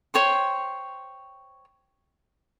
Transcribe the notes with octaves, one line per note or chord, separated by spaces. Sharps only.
C5 C#5 G5 C6